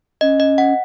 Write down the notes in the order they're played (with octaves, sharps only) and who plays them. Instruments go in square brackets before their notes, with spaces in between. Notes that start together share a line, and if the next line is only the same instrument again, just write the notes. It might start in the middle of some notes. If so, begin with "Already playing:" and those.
[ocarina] C#4 [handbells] D#5
[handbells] D#5
F#5